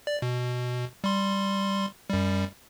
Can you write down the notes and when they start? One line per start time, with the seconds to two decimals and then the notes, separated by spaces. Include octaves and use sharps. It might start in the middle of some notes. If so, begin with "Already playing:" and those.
0.07 D5
0.22 B2
1.04 G3 C6
2.10 F#2 G3